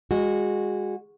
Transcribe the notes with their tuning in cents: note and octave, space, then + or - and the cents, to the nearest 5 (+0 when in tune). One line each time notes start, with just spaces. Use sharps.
G#3 -20 F#4 -15